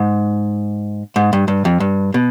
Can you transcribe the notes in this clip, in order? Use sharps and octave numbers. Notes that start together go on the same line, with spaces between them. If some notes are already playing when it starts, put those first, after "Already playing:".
Already playing: G#2
G#2
G2
G2
F2
G2
B2